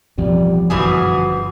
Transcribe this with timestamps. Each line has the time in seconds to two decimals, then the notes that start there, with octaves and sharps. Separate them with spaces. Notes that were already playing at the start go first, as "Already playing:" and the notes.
0.18 A1 F2 B2 F3 G3
0.70 G1 F#2 B2 E3 F3 F#4 G#4